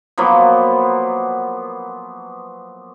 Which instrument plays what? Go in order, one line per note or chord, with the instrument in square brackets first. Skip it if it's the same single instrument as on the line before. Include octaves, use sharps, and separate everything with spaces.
[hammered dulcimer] F3 F#3 A#3 B3